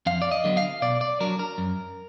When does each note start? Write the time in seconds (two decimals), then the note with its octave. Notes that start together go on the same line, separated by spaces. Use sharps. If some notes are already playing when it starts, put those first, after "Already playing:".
0.06 F2 F5
0.22 D5
0.32 D#5
0.44 D3 F#3 B3
0.57 F5
0.82 B2 D5
1.01 D5
1.20 F#3 D4 A#4
1.39 A#4
1.58 F#2